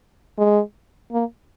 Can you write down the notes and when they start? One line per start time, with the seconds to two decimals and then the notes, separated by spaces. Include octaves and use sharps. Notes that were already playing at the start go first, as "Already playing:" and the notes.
0.38 G#3
1.12 A#3